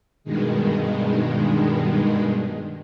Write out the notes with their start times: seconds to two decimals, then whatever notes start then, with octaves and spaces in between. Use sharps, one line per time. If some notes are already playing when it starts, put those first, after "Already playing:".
0.24 G2 B2 D#3 G#3